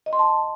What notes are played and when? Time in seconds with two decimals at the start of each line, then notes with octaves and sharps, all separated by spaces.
0.06 D#5
0.13 C6
0.19 A5